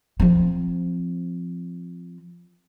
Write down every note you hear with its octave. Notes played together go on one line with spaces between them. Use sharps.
F3 C4